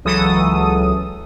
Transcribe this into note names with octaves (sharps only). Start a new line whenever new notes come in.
C#2 E3 F#3 A4 D#6